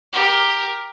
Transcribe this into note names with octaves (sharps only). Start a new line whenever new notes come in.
G4 A#4